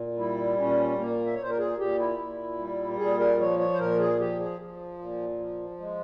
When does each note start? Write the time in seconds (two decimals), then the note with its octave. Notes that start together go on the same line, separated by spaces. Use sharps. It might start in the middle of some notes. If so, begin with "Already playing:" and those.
Already playing: A#2
0.18 G3 E4
0.58 A#2 C#4
0.98 A#2 A#3
1.26 E5
1.34 C#5
1.38 A#2 C5
1.50 A#4
1.58 G#4
1.78 A#2 G4
1.99 E4
2.19 A#2
2.59 G3
2.98 A#2 G#4
3.19 A#4
3.39 F3 C#5
3.59 C#5
3.73 C5
3.79 A#2 A#4
3.99 G#4
4.19 F3 G4
4.40 G#4
4.59 F3
4.99 A#2
5.40 F3
5.80 G#3